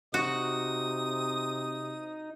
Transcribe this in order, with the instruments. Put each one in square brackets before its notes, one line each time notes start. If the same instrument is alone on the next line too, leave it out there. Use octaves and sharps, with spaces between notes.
[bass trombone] C3 [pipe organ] D#4 [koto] F#4 [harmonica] D#6